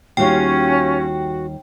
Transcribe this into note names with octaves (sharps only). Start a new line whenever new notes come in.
D#2 G3 C#4 F4 F#4 G5